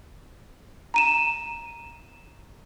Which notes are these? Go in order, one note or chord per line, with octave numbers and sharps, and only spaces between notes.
A#5 D#7 E7